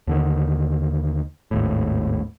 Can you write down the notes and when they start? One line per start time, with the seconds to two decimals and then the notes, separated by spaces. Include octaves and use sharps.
0.07 D#2 D3 D#3
1.51 G#1 D#2 A2